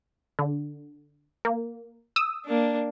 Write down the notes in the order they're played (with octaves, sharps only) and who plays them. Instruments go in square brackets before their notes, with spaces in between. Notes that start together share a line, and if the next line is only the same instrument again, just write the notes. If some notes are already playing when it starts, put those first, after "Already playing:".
[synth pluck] D3
A#3
D#6 E6
[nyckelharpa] A#3 D4